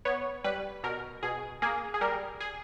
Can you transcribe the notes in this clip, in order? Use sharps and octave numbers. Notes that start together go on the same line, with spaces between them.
B3 C#5
G3 B4
B2 A#4
B2 G#4
A#3 G#4
G#4
G3 A#4
G#4